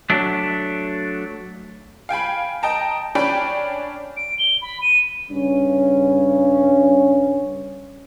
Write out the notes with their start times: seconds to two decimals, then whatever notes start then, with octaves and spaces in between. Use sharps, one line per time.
0.10 F#3 A3 D4
2.09 F5 G5 G#5 B5
2.63 D#5 G5 A5 A#5
3.15 C#4 D4 G5 B5
4.17 D7
4.39 G7
4.62 B5
4.82 D#7
5.30 G2 C#3 C#4